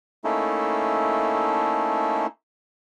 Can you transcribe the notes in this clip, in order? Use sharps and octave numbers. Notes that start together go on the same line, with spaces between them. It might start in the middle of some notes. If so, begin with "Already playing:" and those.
A3 A#3 C#4 D#4 E4 A4